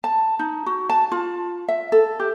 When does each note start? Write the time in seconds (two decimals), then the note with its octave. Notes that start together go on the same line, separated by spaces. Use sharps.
0.04 A5
0.39 D#4
0.66 F#4
0.90 A5
1.12 F4
1.68 E5
1.92 A4
2.20 G4